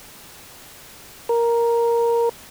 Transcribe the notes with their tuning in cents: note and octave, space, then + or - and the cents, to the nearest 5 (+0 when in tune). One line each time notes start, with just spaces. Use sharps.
A#4 +5